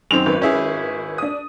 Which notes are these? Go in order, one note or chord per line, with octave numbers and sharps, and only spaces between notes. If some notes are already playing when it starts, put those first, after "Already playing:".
F#2 D#3 C4 F7
G#1 B4
C#4 E4 G#4
D4 D#6